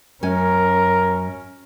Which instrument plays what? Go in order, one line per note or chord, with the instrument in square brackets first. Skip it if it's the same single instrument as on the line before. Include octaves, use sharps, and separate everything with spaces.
[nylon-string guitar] F#2 G#5 [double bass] C#4 [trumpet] A#4